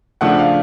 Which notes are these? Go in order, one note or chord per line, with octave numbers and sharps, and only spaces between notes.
C#3 F3 A3 D4 F#5
F5